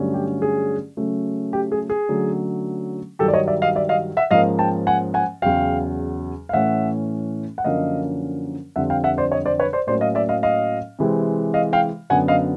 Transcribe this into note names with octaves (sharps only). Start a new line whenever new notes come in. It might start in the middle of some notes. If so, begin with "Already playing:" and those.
Already playing: G2 D3 F#3 A3 C#4
G4
G#4
C#3 F#3 A3 C#4
G4
G#4
G#4
D3 F#3 A3 C#4
G2 D#3 F#3 G4 A4
D5
C#5 D#5
D5 E5
D#5 F5
D5 E5
D#5 F5
E5 F#5
G#2 F3 A#3 C#4 D#5 F5
G5 A5
F#5 G#5
F#5 G#5
E2 C#3 F#3 F5 G5
F5
A2 E3 A3 C#4 E5 F#5
F#5
F#2 D3 F3 A#3 C#4 D#5 F5
F2 D3 G3 C4 E5 F#5
F5 G5
E5 F#5
C5 D5
C#5 D#5
C5 D5
B4 C#5
C5 D5
A2 F#3 A#3 C#4 C5 D5
D#5 F5
D5 E5
D#5 F5
D#5 F5
C3 E3 G#3 C4
D#5 F5
F5 G5
F#2 D3 F#3 B3 F#5 G#5
D#5 F5